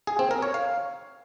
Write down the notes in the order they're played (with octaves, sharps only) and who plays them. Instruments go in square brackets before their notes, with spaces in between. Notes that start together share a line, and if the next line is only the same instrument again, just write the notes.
[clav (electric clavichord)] G#4
C4
A#4
C#5
F5